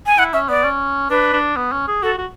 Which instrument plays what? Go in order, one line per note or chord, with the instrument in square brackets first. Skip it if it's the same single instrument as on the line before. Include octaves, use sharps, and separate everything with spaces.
[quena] G#5
[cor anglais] E4 [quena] F#5
[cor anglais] C#4 [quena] E5
[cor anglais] B3 [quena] D5
[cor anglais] C#4
[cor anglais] D4 [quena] B4
[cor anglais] D4
B3
C#4
G#4
[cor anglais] F#4 [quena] A4
[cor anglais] F#4